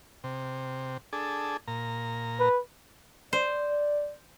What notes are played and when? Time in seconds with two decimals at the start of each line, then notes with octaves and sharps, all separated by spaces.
0.24 C3
1.13 D4 G#4 A4
1.68 A#2 A#5
2.39 B4
3.33 C5 D5